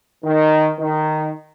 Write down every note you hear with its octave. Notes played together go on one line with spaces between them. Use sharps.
D#3
D#3